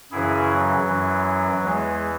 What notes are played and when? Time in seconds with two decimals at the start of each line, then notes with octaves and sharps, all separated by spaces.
0.12 F#2 C#3 E3 E4 G#4
0.51 F#3
0.88 F#2 E3
1.63 E2 E3 G#3